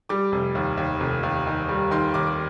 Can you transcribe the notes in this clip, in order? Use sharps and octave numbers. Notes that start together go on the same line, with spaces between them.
G3 D6
F1
D#2
D#2
F1
D#2
D#3
G3
D#3 C6
D#2 D6